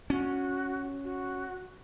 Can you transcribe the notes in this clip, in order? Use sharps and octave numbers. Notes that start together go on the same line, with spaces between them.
C#4 F#4
F#4